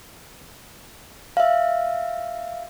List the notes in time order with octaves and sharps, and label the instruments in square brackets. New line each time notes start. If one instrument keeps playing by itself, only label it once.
[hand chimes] E5 F5